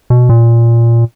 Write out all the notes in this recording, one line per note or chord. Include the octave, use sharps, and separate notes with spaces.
B2
A#2